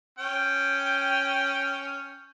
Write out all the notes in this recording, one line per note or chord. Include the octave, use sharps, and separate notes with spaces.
C#4 G5